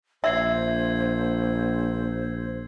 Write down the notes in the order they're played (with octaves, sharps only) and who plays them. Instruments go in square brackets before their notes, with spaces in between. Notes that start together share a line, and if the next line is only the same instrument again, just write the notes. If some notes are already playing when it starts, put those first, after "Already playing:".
[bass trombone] A#1 [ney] C5 [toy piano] E5 [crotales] E6 G#6 C7